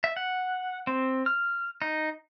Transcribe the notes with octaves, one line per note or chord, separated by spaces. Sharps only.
E5
F#5
C4
F6
D#4